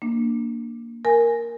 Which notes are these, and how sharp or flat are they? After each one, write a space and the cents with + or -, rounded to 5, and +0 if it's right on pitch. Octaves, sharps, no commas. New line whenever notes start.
A#3 +0 D4 +0
A#4 +0 G#5 +0